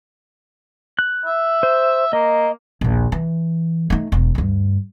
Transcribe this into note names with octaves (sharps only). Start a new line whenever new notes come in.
F#6
E5
C5
A#3 D#5
A#1 D#2
E3
A3 D#4
E1
D2 G2